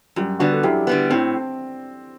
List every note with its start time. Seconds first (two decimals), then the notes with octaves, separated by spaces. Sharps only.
0.16 F#2 G3
0.39 D3 G3 B3 D4 F#4
0.52 A4
0.63 F#2 E4 G4
0.87 D3 G3 B3
1.10 A2 C4